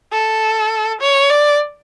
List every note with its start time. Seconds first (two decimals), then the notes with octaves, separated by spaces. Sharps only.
0.12 A4
1.01 C#5
1.30 D5